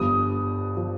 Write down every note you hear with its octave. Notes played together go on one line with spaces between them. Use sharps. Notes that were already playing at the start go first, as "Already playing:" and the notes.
Already playing: G1 G2 F3 D#6
F3